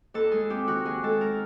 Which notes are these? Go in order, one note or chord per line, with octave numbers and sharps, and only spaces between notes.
D#2 A4
G#3 G#4
C4 G4
D#3 F#4
D#2 G#4
G#3 A4
A#4